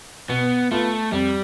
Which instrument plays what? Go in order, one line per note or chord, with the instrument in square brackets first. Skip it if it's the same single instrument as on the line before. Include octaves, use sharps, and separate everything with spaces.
[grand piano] B2 [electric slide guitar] B3
[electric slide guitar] A3 [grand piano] B3 F4
[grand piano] F2 [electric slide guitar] G3